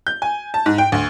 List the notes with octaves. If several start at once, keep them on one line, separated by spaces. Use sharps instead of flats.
G6
G#5
A5
G#2
G5
D2